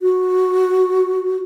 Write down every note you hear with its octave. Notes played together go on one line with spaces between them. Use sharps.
F#4